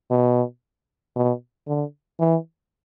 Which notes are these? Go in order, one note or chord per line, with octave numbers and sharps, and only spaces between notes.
B2
B2
D3
E3